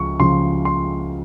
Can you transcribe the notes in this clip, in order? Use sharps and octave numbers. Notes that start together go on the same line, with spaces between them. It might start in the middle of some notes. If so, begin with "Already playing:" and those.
Already playing: C#2 C#3 F3 C#6
C#2 C#3 F3 C6
C6